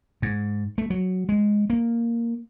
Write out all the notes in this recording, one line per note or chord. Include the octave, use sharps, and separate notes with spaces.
G#2
A3
F#3
G#3
A#3